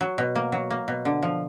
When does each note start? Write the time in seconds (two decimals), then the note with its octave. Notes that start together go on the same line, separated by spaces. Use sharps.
0.01 F#3
0.18 B2
0.35 A#3
0.52 F#3
0.70 A#3
0.88 B2
1.05 D3
1.23 F3